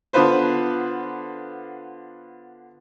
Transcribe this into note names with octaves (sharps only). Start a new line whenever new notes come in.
D3 B3 F4 B4 C5